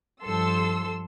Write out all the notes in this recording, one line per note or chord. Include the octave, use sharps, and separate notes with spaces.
G2 F3 A4 C6 E6